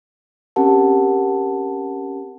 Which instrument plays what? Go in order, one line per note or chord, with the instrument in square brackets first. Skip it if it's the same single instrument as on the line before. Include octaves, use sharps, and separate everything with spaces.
[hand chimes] C4 C#4 G4 A#4 F#5 A5